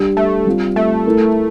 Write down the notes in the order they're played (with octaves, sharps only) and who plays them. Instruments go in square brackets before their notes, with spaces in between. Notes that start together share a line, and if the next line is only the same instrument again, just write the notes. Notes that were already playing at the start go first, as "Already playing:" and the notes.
Already playing: [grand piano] G3 D4 G4
[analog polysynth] A3
[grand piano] G3 C4 F4
[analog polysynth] A3
[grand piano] A3 E4 A#4